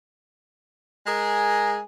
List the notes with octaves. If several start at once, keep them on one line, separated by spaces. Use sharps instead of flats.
G#3 G#4 A#4